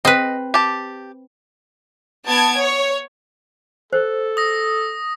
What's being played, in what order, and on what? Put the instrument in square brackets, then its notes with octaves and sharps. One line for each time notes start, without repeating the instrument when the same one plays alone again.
[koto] C4 B4 [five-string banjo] D#5
[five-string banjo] G4 A5
[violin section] B3 A5 G#6 D7
C#5
[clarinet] A4 [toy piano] C5
[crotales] D#6 A#6